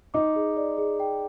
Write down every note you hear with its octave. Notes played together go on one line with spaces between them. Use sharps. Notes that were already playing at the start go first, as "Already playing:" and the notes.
D#4 D6
G#4
D5
G#4
G5